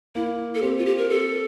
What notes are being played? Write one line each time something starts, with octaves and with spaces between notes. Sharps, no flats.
A#3 E4
A4
C4 G4
F4
G4
A#4
A4